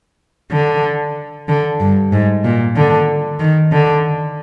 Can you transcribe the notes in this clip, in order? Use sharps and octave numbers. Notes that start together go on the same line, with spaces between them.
D3
D3
G2
G#2
A#2
D3
D#3
D3